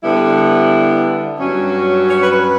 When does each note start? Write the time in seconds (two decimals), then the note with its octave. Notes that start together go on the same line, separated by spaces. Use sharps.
0.03 D3 G3 B3 E4
1.39 G2 F#3 C#4
2.08 C#5
2.20 B4
2.30 B4